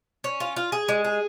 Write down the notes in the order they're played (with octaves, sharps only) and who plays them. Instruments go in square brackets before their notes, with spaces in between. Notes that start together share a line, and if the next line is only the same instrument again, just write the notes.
[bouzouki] C#4
F4
F4
G#4
G#3
G#4